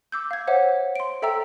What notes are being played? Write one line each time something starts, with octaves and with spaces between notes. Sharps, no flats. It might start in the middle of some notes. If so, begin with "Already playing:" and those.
D6 E6 G6
F5 G#6
C5 C#5 E5 F#5
C6 D7
A4 E5 G5 A#5 E6